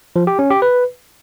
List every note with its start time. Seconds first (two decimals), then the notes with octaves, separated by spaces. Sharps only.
0.16 F3
0.27 G4
0.39 C#4
0.50 G4
0.62 B4